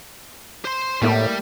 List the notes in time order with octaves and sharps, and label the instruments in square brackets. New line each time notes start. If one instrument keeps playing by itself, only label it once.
[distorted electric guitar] C5 C6
[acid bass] A2 [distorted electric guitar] G3 [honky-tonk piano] A3 A#3 E4